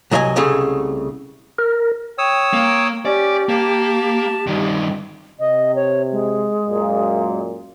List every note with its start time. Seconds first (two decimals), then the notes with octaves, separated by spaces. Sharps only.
0.11 C2 F#3 D#5 E5 G#5
0.36 C2 C#3 A3 G#4
1.58 A#4
2.18 C#5 G5 D#6 E6
2.53 A#3
3.05 C#4 G4 D5
3.49 A#3 A5
4.47 G2 D#3
5.39 C3 D#5
5.75 C#5
6.12 G#3
6.67 F#2 A#2